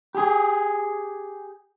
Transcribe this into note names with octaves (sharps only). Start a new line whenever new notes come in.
G4 G#4